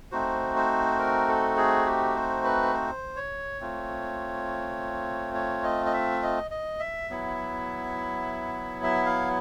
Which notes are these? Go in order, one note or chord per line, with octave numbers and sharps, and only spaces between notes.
A3 C4 D#4 F#4 C5
C5
A#4
A4
G#4
G4
C5
B4
C5
C#5
A3 C4 F4
C#5
D#5
D#5
E5
D#5
D#5
E5
F#3 B3 E4
E5
F5